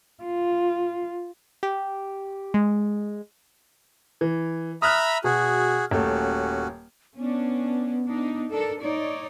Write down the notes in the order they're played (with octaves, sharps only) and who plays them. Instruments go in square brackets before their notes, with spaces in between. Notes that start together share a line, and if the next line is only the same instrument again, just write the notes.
[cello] F4
[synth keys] G4
G#3
[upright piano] E3
[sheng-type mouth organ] E5 A#5 B5 [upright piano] D#6 F6 F#6
[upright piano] B2 [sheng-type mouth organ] F#4 G#4
[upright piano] D#1 A3 [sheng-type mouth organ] C#4 F#4
[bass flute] B3 [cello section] C#4 D4
[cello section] D4 D#4
D4 A4 A#4
D#4 C#5 D5